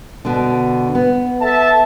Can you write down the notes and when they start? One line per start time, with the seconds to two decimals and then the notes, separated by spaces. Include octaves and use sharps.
0.25 B2 D3
0.95 B3
1.41 A4 E5 A5